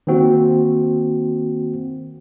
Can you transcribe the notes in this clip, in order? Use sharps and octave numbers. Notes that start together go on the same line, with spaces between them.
D#3 A#3 C4 F#4